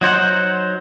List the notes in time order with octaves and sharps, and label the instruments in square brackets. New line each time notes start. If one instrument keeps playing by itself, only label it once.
[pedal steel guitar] F#3 D#4 C5 F#5